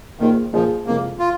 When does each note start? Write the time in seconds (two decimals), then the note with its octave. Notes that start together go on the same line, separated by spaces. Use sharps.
0.20 A#1 A#2 D#3 A#3 G#4 C5
0.53 A#1 A#2 F3 A#3 G#4 C5
0.86 F2 C3 G#3 A#3
1.19 F4